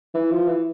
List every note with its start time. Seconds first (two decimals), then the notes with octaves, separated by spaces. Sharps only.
0.15 E3
0.31 F3
0.47 E3